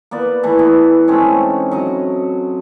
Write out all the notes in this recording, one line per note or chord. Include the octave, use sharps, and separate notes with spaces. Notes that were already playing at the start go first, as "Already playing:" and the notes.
A#3 B3 D5
E3 A3
B3
G#2 A3 C4 C#4
F#3 D#5